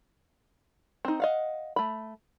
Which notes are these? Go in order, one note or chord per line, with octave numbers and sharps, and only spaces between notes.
C4 D#4
D#5 F5 F#5
A3 B5